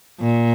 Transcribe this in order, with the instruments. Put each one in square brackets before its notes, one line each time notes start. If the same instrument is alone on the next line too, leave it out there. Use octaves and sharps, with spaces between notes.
[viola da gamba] A#2